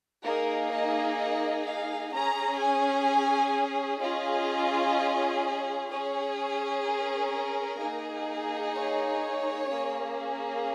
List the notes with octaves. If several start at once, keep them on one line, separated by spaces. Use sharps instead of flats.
A#3 D#4 G#4 A#4
D#5
D#5
F5
C#4 G#4 A#5
G#5
C#4 F4 G#4 D#5
C#4 G#4 C#5
A#4
A#3 D#4 G#4
C#5
A#3 C#4 G#4